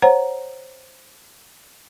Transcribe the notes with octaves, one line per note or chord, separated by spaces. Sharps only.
C5 C#5 F#5 A#5